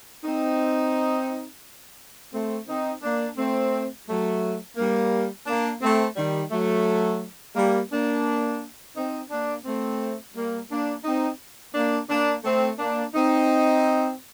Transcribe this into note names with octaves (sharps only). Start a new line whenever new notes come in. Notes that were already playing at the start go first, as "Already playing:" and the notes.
C4 D#4
A3 C4
C4 D#4
A#3 D4
A3 C4
F#3 A3
G3 A#3
A#3 D4
A3 C4
D#3 G3
F#3 A3
G3 A#3
A#3 D4
C4 D#4
A#3 D4
A3 C4
G3 A#3
A#3 D4
C4 D#4
A#3 D4
A#3 D4
A3 C4
A#3 D4
C4 D#4